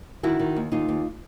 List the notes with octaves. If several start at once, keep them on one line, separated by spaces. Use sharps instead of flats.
D#3 E4 F#4
D#3
D#2
D#2 D#4 F4
D#2